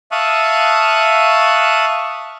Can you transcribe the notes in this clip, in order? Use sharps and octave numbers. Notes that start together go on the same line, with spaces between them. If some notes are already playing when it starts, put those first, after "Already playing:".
E5 F5 A5 C#6 D#6 F#6